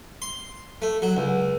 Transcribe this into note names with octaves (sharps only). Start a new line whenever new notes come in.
C6
A3
F#3
C#2